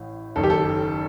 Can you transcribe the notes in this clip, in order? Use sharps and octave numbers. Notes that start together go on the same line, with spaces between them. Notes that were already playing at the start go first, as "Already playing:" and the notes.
Already playing: A1 A2
F#1 F#2 D#3 A4
G4
A4